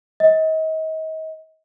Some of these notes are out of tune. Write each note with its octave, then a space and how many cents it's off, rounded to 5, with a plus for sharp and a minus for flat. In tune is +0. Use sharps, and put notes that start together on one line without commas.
D#5 +35